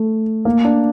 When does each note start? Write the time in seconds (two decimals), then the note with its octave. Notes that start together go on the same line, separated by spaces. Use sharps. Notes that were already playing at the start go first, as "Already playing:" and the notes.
Already playing: A3
0.45 A#3
0.65 D4